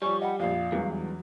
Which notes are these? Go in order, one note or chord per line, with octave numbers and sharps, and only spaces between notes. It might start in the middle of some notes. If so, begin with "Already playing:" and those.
F3 G3 C#5 D5 G#5 C#6
D#5 F#5 G5 B5
A#1 F2 D5 F5
E2 G2 E3 F#3 G#3 E4